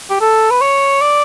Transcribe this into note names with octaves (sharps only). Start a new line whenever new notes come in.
G4
A4
B4
C#5
D5